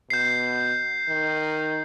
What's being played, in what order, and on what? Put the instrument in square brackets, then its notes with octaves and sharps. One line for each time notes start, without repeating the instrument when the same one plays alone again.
[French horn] B2 [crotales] G6 C7
[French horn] D#3